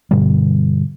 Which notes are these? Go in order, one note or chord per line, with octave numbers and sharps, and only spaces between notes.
G2 B2 D3 G3